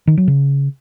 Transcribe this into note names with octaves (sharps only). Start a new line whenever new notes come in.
D#3
F#3
C#3